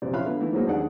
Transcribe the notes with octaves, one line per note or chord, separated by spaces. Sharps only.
A#1 F#2 C3 D5
C#4 F4 E5 F5 B5 F#6
D3 B3
D#3 E3 A3
F3 F#3 G#3 A#3 D#4
D#2 D4 D#4 G#4 D5 F#5